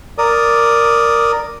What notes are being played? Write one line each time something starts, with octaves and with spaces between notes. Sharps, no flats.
A#4 D5 D#6